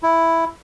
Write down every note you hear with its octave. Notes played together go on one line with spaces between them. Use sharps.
E4